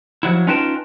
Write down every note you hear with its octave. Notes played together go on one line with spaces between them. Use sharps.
F3 F#3 E4
C#4 D#4 F4 B4 G5 A5